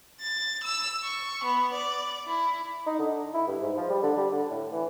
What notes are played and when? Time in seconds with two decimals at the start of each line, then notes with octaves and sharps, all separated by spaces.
0.19 A6
0.62 E6
1.03 C#6
1.43 B3
1.72 D5
2.25 E4
2.86 D#4
2.99 D3
3.34 E4
3.47 G2
3.62 G#2
3.77 F3
3.90 G3
4.03 D3
4.17 G3
4.32 D3
4.50 A2
4.72 E3